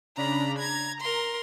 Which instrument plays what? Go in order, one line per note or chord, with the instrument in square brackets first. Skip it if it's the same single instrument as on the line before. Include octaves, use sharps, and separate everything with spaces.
[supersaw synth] C#3 D4 B5 [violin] A#5
[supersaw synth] A#5 [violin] G#6
[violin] A#4 C6